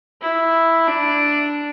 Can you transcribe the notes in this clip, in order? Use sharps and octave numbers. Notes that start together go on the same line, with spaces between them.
E4
D4